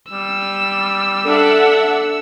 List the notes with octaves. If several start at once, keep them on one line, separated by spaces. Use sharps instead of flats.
G3 E6
D4 A4 E5 F#5